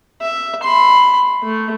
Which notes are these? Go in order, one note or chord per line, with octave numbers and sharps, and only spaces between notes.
E5
B5 C6
A3